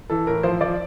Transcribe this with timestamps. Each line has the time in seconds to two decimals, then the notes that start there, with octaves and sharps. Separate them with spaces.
0.10 E3 A4
0.27 A2 A#4
0.43 F3 C5
0.61 F3 D5